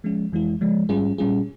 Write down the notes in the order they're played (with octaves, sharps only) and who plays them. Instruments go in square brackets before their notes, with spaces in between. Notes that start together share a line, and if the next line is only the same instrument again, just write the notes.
[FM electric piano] F3 G#3 C#4
F2 E3 G#3 E4
C#3 F3 G#3
G#2 G3 C#4 F4 G#4
A#2 G3 C#4 F4 G#4